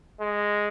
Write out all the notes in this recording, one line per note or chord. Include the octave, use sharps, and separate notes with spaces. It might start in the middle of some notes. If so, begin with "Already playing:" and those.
G#3